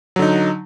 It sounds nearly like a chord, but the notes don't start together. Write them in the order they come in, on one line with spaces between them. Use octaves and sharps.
F#3 D3 D#4